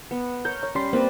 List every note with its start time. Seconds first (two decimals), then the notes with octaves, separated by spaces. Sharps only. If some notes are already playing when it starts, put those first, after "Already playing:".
0.11 B3
0.45 A#4 C#5 G6
0.63 A#4 C#5
0.75 G3 C#4 B5 C6
0.93 A#3 C4 B4 D5